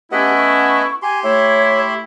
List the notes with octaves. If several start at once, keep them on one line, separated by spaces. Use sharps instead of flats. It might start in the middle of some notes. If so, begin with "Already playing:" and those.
A3 B3 C#4 E4 G4 D#5 F#5
C#6
G4 G#5 C6
A3 E4 C#5